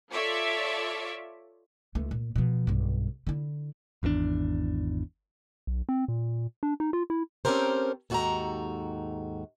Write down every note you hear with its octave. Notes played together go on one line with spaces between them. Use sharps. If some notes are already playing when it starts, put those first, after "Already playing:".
F4 A4 C#5 D5 E5
C#2 A3
A#2
B2 F3
B1 G2
D3 E4
G#1 E2 D3 D4
B1
C4
A#2
D4
D#4
F4
E4
C4 C#4 G4 A4 A#4 C5
D#2 G#2 F#4 A4 G5 A#5